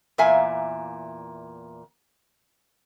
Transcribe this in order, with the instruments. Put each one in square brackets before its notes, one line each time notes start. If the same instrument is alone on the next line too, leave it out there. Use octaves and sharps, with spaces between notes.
[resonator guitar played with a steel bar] E2 A#2 A#3 E5 F5 G#5